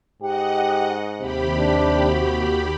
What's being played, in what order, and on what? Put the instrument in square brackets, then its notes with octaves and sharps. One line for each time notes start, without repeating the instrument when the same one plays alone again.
[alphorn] G#2 [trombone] G4 [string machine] D#5 F#5
[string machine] D#2 G4 B5 [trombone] C3
[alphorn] D4
F#4